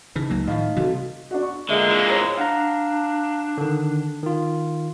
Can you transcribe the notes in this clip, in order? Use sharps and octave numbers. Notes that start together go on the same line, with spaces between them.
C#3 E3 D#4
C#2 F#3 A#3
A2 D#3 F3 D#4 D#5 F5
C3 E3 G3 F#4 A4
D4 F#4
C#6
A#2 D3 G#3 E5
E3 A#3
C5 C#5 D#6
D4 F5 F#5 A#5
D3 D#3
D#3 F4